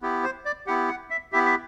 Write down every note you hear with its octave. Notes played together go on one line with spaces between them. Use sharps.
B3 E4 G4
C5
D5
B3 E4 G4 F#5
F#5
E5
B3 E4 G4 E5
E5